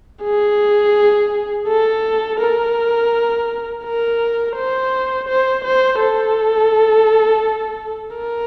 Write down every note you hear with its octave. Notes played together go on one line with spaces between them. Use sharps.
G#4
A4
A#4
A#4
C5
C5
C5
A4
A#4